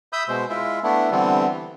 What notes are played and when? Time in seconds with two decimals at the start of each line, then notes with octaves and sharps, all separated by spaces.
0.13 E5 B5 D#6 E6 G6
0.28 B2 G#3 C5
0.50 G#3 E4 F4 E5
0.83 A3 B3 D4 E4
1.11 D3 E3 G3 B3 C4
1.48 E3